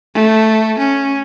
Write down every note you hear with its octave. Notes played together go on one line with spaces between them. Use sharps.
A3
C#4